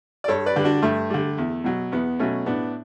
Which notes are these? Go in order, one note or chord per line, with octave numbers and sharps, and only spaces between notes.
D5
G2 A4 C#5
B4 D5
D3 G3
D4 F#4
G2 A3
D3 G3
E2
B2 F#3
E2 B3
B2 F#3 A3 C#4
A2 B3 D4